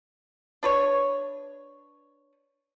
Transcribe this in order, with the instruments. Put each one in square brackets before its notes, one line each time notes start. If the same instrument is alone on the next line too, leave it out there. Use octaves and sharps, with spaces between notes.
[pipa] D4 B4 C#5